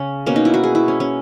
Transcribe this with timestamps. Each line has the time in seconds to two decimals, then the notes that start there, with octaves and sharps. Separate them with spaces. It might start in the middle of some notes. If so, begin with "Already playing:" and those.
Already playing: C#3 C#4
0.26 B2 A#3 C#4
0.36 D#4
0.45 E4
0.54 F#4
0.64 G#4
0.75 E4
0.88 C#4
1.00 C#4